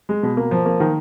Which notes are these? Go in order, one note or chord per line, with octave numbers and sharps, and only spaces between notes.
G#3
B2
A#3
F3
A#3
D#3